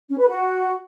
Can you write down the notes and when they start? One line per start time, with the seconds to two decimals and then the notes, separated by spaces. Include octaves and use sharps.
0.09 C#4
0.19 B4
0.29 F#4